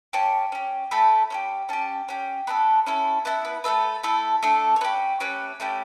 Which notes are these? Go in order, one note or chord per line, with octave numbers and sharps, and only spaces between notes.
C#4 G4 A5
C#4 G4
A3 E4 A4 B5
C#4 E4 G4
C#4 G4 A5
C#4 G4
B3 D4 A4 B5
C#4 E4 A4
B3 E4 A4 A5
B4
A3 E4 A4 B4
A3 E4 A4
A3 D4 A4
C#5
C#4 G4 B4
A3 C#4 G4 B4
A3 C#4 E4 G4